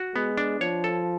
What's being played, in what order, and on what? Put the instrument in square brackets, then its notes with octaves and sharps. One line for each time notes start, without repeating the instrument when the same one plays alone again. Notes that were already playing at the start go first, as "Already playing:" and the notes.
Already playing: [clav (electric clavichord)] F#4
[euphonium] G#3 [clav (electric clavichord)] B3
[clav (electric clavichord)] D4
[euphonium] F3 [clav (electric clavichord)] C#5
[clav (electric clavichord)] A4